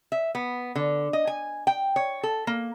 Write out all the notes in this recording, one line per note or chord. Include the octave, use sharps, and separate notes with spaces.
E5
B3
D3
D#5
G#5
G5
C#5
A4
A#3